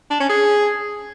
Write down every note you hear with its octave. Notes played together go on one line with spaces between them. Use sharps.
D4
C#4
G#4